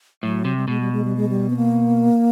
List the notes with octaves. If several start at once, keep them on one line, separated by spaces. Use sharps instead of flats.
A2 F#3
C3
G3
B2 G#3
G3
G#3
G3
G#3
G3
B3
A#3